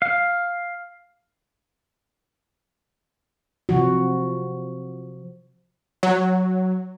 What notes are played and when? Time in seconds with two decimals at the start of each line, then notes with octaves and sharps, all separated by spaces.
0.02 F5
3.69 C3 F3 F#4
6.03 F#3